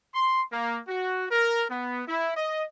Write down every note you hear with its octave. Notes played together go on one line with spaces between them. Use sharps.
C6
A#3
F#4
A#4
B3
E4
D#5